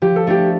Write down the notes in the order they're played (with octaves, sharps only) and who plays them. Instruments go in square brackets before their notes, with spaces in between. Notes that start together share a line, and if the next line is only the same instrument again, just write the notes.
[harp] F3 [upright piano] G4
[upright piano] A4
[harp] A3 D4 [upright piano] G4